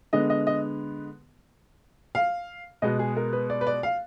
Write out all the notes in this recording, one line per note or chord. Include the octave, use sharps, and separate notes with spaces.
D3 G#3 B3 D#5
D#5
D#5
F5
B2 G#3 B3 D#5
G#4
A#4
B4
D5
B4
D5
F5